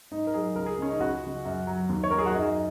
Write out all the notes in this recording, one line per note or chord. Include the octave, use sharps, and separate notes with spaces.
G#2 D#4
A#4
F#3 G#4
C#2 A#4
G#4
C#3 G#3 C#4
D#4
C#2 F#4
C#3 G#3
F#2
F#3
D#2
C#5
D#3 F#3 A#4
G#4
F#4
F#2 D#4